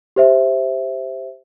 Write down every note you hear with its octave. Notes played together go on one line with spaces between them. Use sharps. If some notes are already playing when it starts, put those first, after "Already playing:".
G4 C5 E5